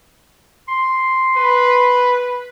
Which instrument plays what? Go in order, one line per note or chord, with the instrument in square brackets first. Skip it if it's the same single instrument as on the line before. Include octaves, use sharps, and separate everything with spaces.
[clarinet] C6
[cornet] B4